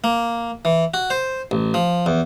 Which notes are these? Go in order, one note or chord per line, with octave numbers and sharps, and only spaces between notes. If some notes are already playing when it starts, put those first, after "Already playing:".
A#3
E3
F#4
C5
A1
F3
E2